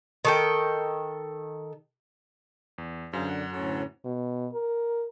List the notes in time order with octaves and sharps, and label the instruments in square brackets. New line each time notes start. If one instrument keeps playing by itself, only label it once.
[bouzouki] D#3 A4 G5
[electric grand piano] E2
[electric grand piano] F#2 [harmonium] D3 D4 [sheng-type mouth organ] G#4 C5 F5
[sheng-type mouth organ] F#5
[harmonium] D2 A2 C#4 [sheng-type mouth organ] F#4 A4
[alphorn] B2
A#4